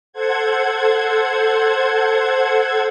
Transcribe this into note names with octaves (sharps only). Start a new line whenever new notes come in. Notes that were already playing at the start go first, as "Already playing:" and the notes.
A4 C5 F#5 G#6